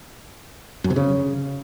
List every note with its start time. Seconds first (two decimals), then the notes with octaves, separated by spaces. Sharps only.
0.84 F#2
0.90 C3
0.96 C#3